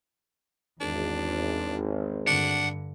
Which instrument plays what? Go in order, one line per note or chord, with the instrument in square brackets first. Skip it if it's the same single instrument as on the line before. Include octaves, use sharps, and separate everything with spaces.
[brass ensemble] G#1 [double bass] E2 [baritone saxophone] D4
[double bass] G2 D3 [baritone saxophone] D4 [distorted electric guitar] F#5